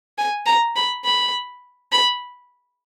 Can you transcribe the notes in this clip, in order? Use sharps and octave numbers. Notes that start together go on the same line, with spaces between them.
G#5
A#5
B5
B5
B5